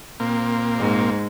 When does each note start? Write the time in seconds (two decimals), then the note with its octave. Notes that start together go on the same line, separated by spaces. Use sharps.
0.20 A#2 A#3 C4
0.79 G#2